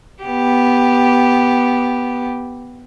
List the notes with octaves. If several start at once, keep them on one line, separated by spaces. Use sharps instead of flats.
B3 G4